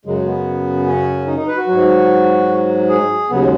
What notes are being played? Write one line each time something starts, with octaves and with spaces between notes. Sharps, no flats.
F#2 C#3 F#3 G#3
B3
C#4
D#4
D#4
B4
F#4
G#2 F#3
G#4
D#2 C#3 F#3 B3
G#3